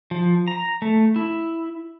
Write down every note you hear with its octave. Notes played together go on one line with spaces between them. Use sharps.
F3
A#5
A3
E4